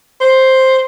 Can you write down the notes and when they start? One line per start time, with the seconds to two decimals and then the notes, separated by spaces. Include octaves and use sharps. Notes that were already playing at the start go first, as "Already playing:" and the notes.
0.21 C5